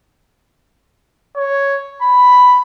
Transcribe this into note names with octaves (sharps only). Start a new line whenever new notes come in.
C#5
B5